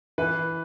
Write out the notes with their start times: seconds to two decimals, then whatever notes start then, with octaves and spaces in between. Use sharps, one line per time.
0.18 E3 B4